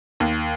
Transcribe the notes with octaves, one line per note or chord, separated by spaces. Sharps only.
D#2